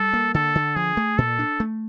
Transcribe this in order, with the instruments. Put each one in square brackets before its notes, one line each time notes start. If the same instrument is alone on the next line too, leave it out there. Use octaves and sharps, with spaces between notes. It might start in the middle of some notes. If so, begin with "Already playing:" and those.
Already playing: [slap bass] G3 [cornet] A4
[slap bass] A#3
[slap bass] D3 [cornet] A4
[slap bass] D3
[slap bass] F3 [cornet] G#4
[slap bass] A3
[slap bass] A#2 [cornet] A4
[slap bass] D4
A3